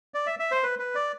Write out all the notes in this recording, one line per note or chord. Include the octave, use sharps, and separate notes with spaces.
D5
E5
E5
C5
B4
B4
D5